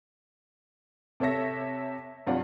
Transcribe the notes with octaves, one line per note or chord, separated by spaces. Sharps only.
C3 A4 C#5 E5 A#6
G2 C3 F#3 F4 D5 F#5